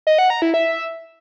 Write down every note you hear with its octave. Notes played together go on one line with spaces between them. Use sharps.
D#5
F#5
A#5
E4
E5